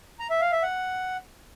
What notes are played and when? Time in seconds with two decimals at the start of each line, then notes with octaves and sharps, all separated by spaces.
0.20 A#5
0.30 E5
0.41 F5
0.52 E5
0.63 F#5